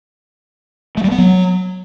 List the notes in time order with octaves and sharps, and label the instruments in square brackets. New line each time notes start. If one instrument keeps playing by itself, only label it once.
[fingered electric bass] A3
G3
B3
F#3